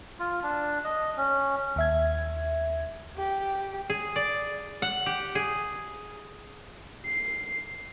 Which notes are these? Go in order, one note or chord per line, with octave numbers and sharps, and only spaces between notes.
F4
D4
D#5
C#4
D#2 E5 G#6
G4
G#4
D5
F#5
G4
G#4
C7